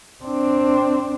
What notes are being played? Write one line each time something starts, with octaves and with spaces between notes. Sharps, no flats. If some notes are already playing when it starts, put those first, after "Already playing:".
C4 D4